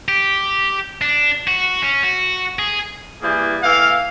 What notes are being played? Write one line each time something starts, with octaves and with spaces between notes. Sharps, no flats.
G4
D4
F#4
C#4
F#4
G#4
E3 G3 A#3 G#4
A2 E3 F5